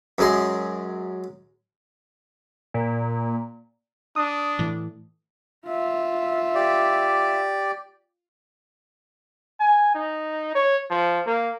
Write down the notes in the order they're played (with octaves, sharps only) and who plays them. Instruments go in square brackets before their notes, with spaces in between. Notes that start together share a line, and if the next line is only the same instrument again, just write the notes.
[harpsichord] F#2 G#3 C6
[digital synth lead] A#2
[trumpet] D4 [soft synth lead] D#6
[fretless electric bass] A2 E3
[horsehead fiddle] F4 E5
[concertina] G4 D5
[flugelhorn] G#5
D#4
C#5
F3
A#3